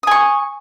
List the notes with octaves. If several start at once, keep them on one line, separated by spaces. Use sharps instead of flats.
G#5 C#6 D#6